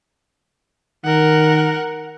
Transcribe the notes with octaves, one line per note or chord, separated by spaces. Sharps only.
D#3 A#4 F#5